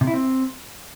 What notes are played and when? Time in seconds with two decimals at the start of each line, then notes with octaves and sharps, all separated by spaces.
0.01 C3
0.07 E4
0.14 C4